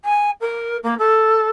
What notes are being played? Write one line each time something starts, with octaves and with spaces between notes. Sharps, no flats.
G#5
A#4
A#3
A4